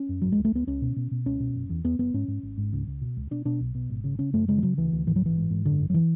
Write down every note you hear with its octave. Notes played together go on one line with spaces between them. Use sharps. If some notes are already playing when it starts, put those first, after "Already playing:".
Already playing: C#4
F#2
G#1 F#3
G#3
C#2
A3
C#2 B3
C#2 C#4
B2
B2
B2
C#2 C#4
B2
F#1
E2
E2 B3
F#1 B3
G#2 C#4
G#2
G#1
G#2
C#2
C#2
B2
C#2
B2 D4
B2 D4
B1
B2
G#1
C#3
C#3 C#4
F#2 A3
C#3 G#3
E3
C#3 F#3
D2 E3
D2
G#2 E3
F#3
A1 E3
G#2
G#2
F#2 D3
G#1
F#3
E3